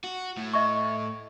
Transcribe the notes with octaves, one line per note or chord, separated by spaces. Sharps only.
F#4
A2
D#5 E5 C#6